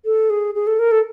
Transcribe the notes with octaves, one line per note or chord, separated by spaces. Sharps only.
A4
G#4
G#4
A4
A#4
A4